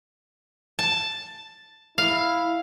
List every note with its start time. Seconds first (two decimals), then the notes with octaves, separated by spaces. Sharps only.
0.79 A5
1.98 E4 F5